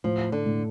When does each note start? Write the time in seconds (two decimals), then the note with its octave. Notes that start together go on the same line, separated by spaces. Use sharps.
0.04 A2 F3
0.32 D3
0.46 A2